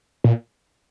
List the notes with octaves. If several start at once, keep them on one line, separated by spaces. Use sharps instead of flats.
A#2